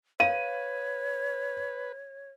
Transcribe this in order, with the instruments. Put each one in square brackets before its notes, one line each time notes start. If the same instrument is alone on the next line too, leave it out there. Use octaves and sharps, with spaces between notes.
[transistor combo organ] B4 [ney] C#5 [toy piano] F5 [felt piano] D#7